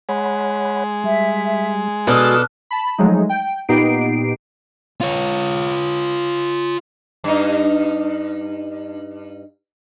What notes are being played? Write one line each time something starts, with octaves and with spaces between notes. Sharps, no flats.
G#3 C#5 F#5 B5
G3 E5
B2 D4 F#4 A4 D#6 F6 F#6
A5 B5
F3 F#3 G#3 A3 D#4
G5
A#2 B3 D#4 G4 C7 D7
F4 C#5
G2 D#4